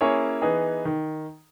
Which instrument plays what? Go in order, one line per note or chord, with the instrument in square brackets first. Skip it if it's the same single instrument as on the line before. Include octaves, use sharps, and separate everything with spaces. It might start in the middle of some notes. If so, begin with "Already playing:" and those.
[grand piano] A#3 C#4 E4 G#4 C#5
E3 B3 D#4 G#4
D#3